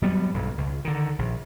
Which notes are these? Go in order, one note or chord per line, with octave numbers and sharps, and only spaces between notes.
F#3 G3 B3
B1 G2
C#2
D3 D#3
A#1